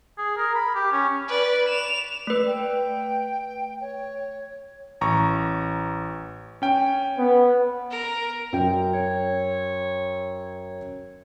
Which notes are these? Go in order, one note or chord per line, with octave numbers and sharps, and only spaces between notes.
G#4
A#4
B5
G4
C#4
B4 D5
E7 F7
A3 B4
G5
C#5
A1 A#5 C#6
C#4 G5
B3
A#4
F#2 G5
C#5